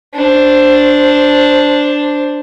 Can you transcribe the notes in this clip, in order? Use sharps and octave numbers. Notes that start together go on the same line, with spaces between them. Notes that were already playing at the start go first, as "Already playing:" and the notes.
D4 C5